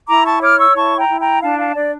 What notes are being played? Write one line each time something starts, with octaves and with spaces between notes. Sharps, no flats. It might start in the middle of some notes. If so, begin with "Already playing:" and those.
E4 A#5 D6
A5 C#6
C#5 D6 F6
C#6 E6
E4 A5 C#6
G5 A#5
E4
G5 A#5
D4 F5 A5
F5 A5
D4 D5